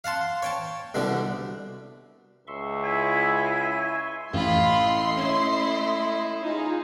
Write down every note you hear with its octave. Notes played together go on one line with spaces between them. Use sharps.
F5 F#5 A5 C6
C#5 G5 A5
C2 B2 D3 G3
C#2 E5 C6 C#6
E4 G#5
A1 A3 F4 D#5 B5 C6
C#4 E4
D#4 F4 G#4